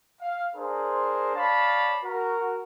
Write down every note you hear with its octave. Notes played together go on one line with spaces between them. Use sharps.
F5
D4 G#4 A#4 C5
C#5 D5 F5 A5 B5
F#4 A#4